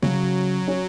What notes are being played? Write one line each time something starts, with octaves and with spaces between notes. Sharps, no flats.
C#3 F#3 C#4
C#4